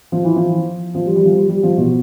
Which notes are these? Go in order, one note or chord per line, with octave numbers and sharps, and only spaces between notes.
F3
E3
F3
F3
G3
G3
F3
G3
G3
F3
B2